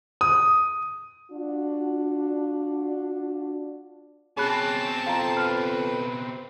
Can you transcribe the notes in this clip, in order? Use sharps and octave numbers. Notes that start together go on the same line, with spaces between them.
D#6
D4 F4 F#4
B2 C4 C#4 G#4 A5 B5 F#6
F2 F5 A#5
B4 F6